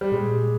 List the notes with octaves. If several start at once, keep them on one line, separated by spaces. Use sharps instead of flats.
G3
A#2 G#3